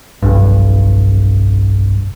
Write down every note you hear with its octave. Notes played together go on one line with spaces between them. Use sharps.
F1 B1 G2